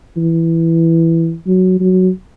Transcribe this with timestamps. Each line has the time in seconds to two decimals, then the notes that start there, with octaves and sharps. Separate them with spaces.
0.17 E3
1.46 F#3
1.80 F#3